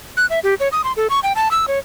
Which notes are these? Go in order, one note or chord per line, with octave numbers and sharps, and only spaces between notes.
F#6
E5
G4
C#5
D#6
C6
A4
C#6
G5
A5
E6
C#5